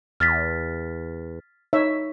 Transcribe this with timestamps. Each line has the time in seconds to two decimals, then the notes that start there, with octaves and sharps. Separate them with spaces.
0.20 E2 F6 A6 B6
1.73 D#4 C#5 E5